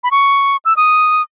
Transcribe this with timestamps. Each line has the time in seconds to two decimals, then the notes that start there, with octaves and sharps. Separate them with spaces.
0.04 B5
0.11 C#6
0.65 E6
0.77 D#6